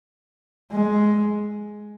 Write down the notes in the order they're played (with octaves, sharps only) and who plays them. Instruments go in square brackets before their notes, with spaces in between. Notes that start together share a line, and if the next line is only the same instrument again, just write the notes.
[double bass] G#3